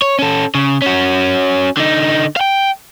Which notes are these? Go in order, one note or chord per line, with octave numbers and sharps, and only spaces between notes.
C#5
C#4 A4
C#3
C#4 F#4
D3 D#4
F5 G5